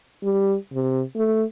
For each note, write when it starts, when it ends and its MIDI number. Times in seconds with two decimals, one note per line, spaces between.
0.23 0.55 55
0.73 1.03 48
1.16 1.44 57